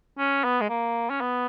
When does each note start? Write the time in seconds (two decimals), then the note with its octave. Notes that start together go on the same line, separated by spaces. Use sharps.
0.19 C#4
0.44 B3
0.61 G#3
0.70 A#3
1.10 C#4
1.21 B3